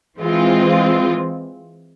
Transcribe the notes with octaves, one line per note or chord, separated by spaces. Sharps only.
E3 G#3 C4 F4